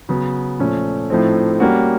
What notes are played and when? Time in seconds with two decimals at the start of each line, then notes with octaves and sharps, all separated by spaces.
0.09 C#3 F#3 B3
0.59 A#2 F3 A3 C#4
1.10 A2 F3 A3 C4 D#4
1.60 G3 A#3 C#4 F#4